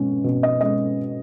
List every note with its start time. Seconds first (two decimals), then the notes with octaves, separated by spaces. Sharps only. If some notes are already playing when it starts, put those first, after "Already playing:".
Already playing: B2 G#3 C#4
0.24 B2
0.43 D#5
0.61 G#3 C#4 D#5